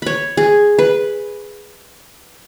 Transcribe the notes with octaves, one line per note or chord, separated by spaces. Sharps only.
C#5 B5
G#4
B4